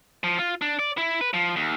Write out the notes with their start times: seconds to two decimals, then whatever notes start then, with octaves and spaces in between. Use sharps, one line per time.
0.24 F3
0.39 F4
0.62 D4
0.79 D5
0.98 E4
1.21 B4
1.33 F3
1.56 D#2